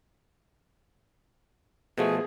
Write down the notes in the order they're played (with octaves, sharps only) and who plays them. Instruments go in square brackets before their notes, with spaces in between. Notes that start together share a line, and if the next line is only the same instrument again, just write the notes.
[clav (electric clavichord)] B2 F3 A3 [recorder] G#4